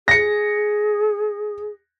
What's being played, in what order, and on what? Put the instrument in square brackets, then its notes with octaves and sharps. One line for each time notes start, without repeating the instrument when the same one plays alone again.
[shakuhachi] G#4 [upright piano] A#6 C#7